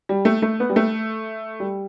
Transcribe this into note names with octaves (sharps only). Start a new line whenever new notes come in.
G3
A3
A3
B3
G3
A3
G3